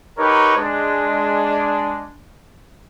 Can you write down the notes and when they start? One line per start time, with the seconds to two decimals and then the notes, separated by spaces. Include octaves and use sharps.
0.19 D#4 G4 A#4 B4 C#5
0.57 G#3 D4